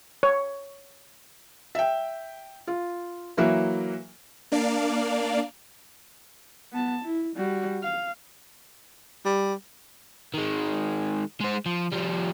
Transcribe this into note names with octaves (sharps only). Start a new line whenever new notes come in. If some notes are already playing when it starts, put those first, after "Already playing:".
C#5
E5 G5
F4
E3 F#3 A#3 E4
A#3 D4 D5 F5
B3 A5
E4
G3 F#4
F5
G3
D#3 G#3
G#3 C5
F3
F3 G3